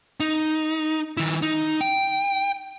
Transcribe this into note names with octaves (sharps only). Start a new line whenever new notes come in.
D#4
D#3 E4
D#4
G5